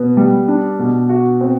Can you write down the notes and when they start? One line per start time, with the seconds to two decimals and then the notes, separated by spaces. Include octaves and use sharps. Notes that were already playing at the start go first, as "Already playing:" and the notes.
Already playing: B2 B3
0.17 G3
0.48 D4
0.79 B2
1.09 F#4
1.41 C4